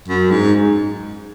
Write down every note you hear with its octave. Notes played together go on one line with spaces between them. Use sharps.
F#2
G#2